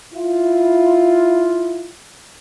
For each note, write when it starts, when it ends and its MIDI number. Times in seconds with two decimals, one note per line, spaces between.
0.14 1.90 64
0.14 1.90 65